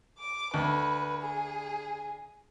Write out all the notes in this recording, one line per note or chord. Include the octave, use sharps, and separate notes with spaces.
D6
D2 B4
G#4